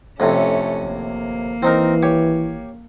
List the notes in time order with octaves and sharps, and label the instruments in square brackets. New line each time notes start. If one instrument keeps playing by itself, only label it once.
[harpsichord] F2 A2 C3 [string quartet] A3 C#4
[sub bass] G#1 [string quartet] A#3
[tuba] E3 [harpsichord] C4 D#4 A#4
[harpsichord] G4 C#5